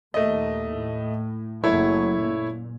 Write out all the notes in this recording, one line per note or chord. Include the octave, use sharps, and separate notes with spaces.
D#2 A#2 A3 D#5
A2
F#1 F#3 A3 E4 C#5
A#2